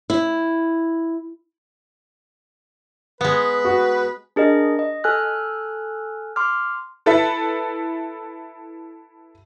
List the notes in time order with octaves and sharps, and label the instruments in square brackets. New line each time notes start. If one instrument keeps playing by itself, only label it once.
[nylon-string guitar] E4
[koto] G#3 B3 [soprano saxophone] B4
[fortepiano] F#4
[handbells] D4 G#4 A#4 D#5
D#5
A4 G#5 F6 F#6
C6 D6 F6
[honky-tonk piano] E4 A4 B4 E5